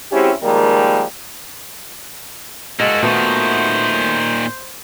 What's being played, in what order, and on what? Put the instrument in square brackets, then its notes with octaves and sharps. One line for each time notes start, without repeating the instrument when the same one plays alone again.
[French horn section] G#3 C4 C#4 E4 F#4 G4
D#3 F3 G3 G#3 A#3
[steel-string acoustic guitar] G#3 [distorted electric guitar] A#3 F#4 [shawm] A4
[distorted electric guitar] A#2 D#3 [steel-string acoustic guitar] A3 B3 F#4 [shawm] C5